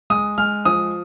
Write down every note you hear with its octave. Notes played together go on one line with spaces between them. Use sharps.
G#3 D#6
G#3 F6
F3 D#6